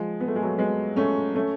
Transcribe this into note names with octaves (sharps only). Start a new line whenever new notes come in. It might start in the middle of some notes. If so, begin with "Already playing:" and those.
Already playing: F3 G#3
B3
A3
G#3
F#3 A3
G#3 B3
A3 C#4
A3 C#4